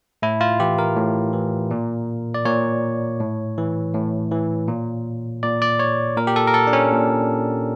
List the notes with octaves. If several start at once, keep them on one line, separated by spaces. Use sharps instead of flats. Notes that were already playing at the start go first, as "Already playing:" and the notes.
A2 E4
F4
E3 G4
A#4
A2
E3
A#2
D5
A#2 C#5
A2
E3
A2
E3
A#2
A#2 D5
D5
C#5
A#2 A#4
G4
A4
A#4
A4
D4
C#4
A#2